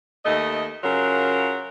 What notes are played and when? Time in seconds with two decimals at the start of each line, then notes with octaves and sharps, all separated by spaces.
0.25 D#2 A3 D#5
0.83 C#3 F#3 F4 A#4